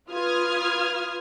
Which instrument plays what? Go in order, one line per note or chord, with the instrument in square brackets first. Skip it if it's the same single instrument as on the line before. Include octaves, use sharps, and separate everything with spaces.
[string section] F4 B4 D#6 F6 G#6